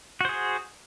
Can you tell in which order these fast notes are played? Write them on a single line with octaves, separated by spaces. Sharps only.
F#4 C5 G#4